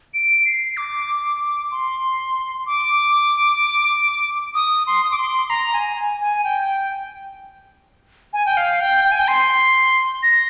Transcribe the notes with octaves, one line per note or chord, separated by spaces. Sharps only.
D7
C7
D6
C6
D6
D#6
C6
D#6
D6
C6
A#5
G#5
G#5
G#5
G5
G#5
G5
F5
G5
G5
G#5
G5
C6
A#6